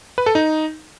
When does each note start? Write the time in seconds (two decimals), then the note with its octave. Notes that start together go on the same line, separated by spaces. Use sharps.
0.18 B4
0.26 A4
0.35 D#4